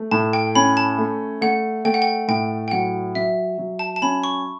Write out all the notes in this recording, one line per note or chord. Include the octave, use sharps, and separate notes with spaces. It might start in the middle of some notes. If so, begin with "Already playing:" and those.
Already playing: A3
A2 A5
G5
C#4 B5
A5
A3
A3 F#5
A3 G5
F#5
G5
A2 G5
G5
F#3 F#5
F#3 E5
F#3
A5
A5
C#4 B5
C#6